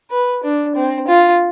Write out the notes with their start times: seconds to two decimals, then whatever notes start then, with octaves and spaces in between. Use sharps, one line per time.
0.11 B4
0.43 D4
0.75 C4
1.08 F4